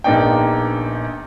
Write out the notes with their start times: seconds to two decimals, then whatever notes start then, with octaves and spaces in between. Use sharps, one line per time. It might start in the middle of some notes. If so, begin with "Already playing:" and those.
0.04 A#1 A#3 B3 D4 D#4 G5